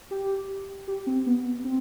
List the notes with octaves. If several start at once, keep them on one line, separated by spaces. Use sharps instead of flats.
G4
G4
C4
B3
C4